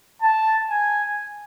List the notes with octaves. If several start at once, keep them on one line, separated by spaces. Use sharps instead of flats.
A5
G#5